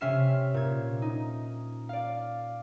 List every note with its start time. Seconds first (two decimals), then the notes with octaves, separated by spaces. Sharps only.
0.01 C3 C#4 E5 F6 C7 E7
0.54 A#2 G#6
1.02 D#4
1.89 D5 F5